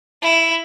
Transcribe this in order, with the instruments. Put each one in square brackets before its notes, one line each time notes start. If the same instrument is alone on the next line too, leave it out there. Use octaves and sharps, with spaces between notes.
[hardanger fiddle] E4